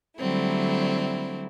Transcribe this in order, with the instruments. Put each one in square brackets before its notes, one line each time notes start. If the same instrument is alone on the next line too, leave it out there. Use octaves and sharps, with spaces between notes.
[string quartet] D3 F#3 G3 A3 C4 E4